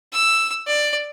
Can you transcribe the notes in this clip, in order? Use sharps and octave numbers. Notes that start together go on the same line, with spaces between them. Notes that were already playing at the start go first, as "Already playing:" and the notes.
E6
D5